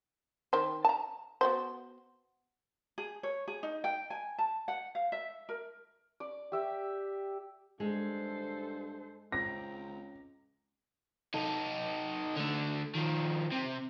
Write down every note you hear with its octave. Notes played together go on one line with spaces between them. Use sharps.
D#3 C5
A5 A#5
B3 F#4 C5
G#4
C#5
G#4
D#4
G5
G#5
A5
F#5
F5
E5
A#4
D5 D6
G4 E5 G5
G2 G#3 A4 C5
C#2 C4 A#5 A#6
D#4 A4
D3 A3
D#3 F3
C3